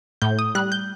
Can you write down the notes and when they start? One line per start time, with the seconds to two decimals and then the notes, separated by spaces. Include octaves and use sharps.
0.22 A2 G6
0.39 D#6
0.55 G3 F#6
0.72 G6